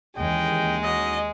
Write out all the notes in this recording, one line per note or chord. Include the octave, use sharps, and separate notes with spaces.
D#2 C#3 E3 G#3 D#5 G5
C#4 D#4 F#4 D#5